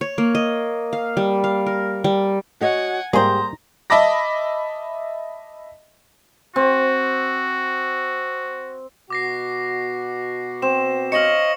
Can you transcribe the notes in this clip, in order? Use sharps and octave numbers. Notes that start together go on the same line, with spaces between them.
C#5
A#3
D#5
F5
G3
F5
A#4
G3
F#4 C#5 D#5 F#5 G#5
G#2 G3 A#3 G4 G#4 C5 A#5
D#5 E5 A5 B5 D6 A#6
C4 F#4
B2 F#4 D6 A#6 C7
C4 E7
C#5 D#5 F5 C#7 F#7